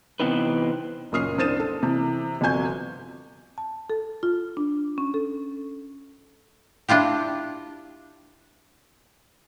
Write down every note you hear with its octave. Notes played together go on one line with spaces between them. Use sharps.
C3 E3 B3 C4 D#4 B4
F#1 A#2 C#4 D#6 F6 C7
C2 D4 C5 A6 D#7 E7
A4
C3 E3
G1 C3 F3 F#4 G#5 G6
A5
A4
F4
D4
C#4
A4
D4 E4 F4 G4